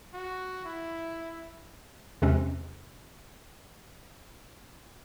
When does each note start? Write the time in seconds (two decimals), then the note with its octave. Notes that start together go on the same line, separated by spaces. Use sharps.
0.14 F#4
0.65 E4
2.22 E2 C3 G#3 C4 C#4